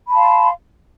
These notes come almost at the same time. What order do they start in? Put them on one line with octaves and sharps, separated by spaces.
B5 A5 F5 C6